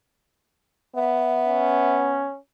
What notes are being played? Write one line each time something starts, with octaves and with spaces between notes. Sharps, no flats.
B3 E5
C#4